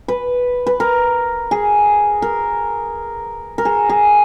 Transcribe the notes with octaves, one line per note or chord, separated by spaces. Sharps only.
B4
B4
A#4
G#4
A#4
A#4
G#4
G#4